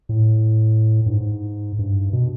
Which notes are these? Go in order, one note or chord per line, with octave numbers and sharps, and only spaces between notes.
A2
G2
G#2
G2
B2